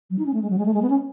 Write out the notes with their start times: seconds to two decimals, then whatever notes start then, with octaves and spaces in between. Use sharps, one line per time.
0.10 F#3
0.19 D#4
0.26 C#4
0.33 A3
0.42 G#3
0.50 F#3
0.58 G#3
0.65 A3
0.74 G#3
0.82 B3
0.90 C#4